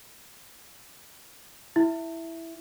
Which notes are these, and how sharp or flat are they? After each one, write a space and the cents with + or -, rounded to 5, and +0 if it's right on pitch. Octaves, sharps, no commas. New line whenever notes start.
E4 +0 E5 +0